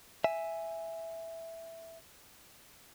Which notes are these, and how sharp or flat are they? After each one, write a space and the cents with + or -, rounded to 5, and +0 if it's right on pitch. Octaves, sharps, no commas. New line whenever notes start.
E5 +0 G#5 +0